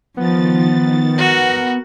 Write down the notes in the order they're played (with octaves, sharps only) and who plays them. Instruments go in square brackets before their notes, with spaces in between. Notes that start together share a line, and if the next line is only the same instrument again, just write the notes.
[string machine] D#3 A6 [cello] F3 [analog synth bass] B3
[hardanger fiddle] F#4 [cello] A#4 F#5